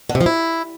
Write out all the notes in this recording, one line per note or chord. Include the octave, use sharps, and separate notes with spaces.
D3
C3
F3
E4